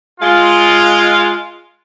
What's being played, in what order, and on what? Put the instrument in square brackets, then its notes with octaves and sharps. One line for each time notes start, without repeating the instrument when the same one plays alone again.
[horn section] G#3 F4